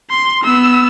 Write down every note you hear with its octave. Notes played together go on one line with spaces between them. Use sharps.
C6
B3 E6